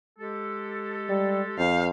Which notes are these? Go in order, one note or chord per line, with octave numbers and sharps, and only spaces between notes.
G#3 G4 A4
G3
F2 C5 F5